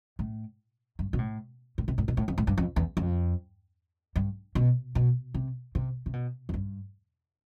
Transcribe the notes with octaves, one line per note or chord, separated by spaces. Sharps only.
A2
G2
B2
A2
A2
C3
A2
B2
A2
F2
A2
G2
F2
E2
F2
G2
B2
B2
C3
C3
C3
B2
F2
G2